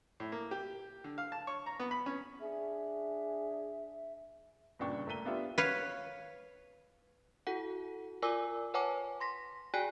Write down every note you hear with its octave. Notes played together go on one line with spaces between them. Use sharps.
A2
A#3
G4
D3
F5
A5
C#5
A#5
B3
B5
C#4
D4 G#4 E5
G1 A#2 C#3 D4 G5 C#6
G1 A3 A#3 B6 D#7 G7
B3 D4 F4 G4 E5
B4 C#5 F5
E4 F#4 A4 F#5
F4 A#4 D5 G#5 D6 E6
B4 C#5 F#5 G#5 A5 D6
C6 A#6 B6
F#4 G#4 D5 G5 G#5 F#6